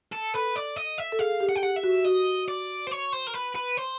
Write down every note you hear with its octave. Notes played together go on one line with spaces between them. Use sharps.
A4
A4 B4
D5
D#5
E5
A4
G#4 F5
G4
F#5
G5
G4 F#5
E5
F#4
F#4 D#5
D5
C5
C#5
C5
A#4
B4
B4
C5